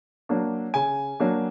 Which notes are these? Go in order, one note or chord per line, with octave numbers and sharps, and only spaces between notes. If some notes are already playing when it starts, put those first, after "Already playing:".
F#3 A#3 D4
C#3 G#5
F#3 A#3 D4